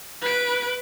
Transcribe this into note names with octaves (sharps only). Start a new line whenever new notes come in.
B4 D7